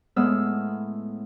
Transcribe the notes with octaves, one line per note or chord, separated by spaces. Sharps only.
A2 G#3 B3 E6 F6